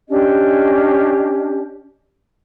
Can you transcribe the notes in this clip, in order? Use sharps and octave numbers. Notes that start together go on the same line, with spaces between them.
C#4 D4 G4 D#5